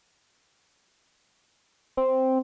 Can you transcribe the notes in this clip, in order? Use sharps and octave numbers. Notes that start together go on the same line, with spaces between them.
C4